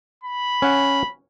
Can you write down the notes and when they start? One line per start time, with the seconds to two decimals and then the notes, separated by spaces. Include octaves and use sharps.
0.24 B5
0.62 C#4 F#5